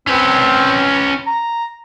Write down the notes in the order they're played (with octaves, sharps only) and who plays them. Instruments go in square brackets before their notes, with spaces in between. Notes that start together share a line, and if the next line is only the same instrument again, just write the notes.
[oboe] C4 [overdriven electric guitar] C#4 B4
[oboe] A#5